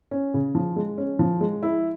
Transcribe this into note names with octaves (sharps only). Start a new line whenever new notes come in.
C#4
C#3
F3
G#3
C#4
F3
G#3
E4